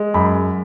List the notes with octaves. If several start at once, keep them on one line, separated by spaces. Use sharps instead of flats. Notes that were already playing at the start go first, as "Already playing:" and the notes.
Already playing: G#3
F#2 B5